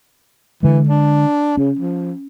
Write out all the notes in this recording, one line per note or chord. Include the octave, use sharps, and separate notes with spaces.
D3 E3 G#3
D4
C#3 C#4
F3